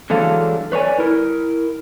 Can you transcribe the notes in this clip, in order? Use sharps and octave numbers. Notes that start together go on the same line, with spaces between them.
D3 E3 F#3 G#3 A4 F5
B4 C#5 D5 G#5
E4 A#4